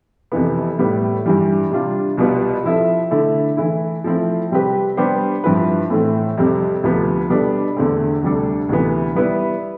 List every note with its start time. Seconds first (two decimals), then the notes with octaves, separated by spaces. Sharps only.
0.32 F2 C3 E3 B3
0.79 A2 G3 B3
1.26 G2 E3 G3
1.71 C3 G3 D4 F4
2.18 C2 B2 G3 B3 F4
2.64 F3 C4 E4 A4 E5
3.11 D3 A3 E4
3.57 E3 A3 E4
4.04 F3 A3 C4 E4
4.51 C3 G3 C4 G4 B4
4.97 G3 B3 D4 G4 C5
5.44 G2 F3 C4 E4 B4
5.90 A2 E3 A3 C4
6.37 F2 C3 G3 C4
6.83 D2 C3 F3 B3
7.29 B2 G3 B3 D4 A4
7.77 E2 D3 A3 C4
8.22 D2 C3 G3 D4 A4
8.69 D2 C3 E3 B3
9.15 G3 B3 E4 B4 D5